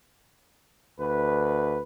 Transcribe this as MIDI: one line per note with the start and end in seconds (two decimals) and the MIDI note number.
1.00 1.82 38
1.00 1.82 71